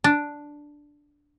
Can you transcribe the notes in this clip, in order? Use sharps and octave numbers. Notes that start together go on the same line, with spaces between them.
D4